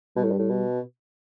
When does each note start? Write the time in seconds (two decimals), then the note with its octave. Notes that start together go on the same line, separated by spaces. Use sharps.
0.16 B2 G3
0.24 A2
0.31 G2
0.39 A2
0.50 B2